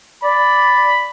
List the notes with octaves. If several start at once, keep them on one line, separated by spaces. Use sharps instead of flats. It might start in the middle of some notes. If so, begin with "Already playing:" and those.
D5 B5